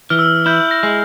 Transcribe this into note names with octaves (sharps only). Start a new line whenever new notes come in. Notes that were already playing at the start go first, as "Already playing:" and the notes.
E3 F6
E6
F6
E4 G6
A#6
G#3